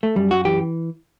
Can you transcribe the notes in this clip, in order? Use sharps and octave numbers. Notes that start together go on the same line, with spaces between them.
A3
F#2 G3
F#4
E3 G4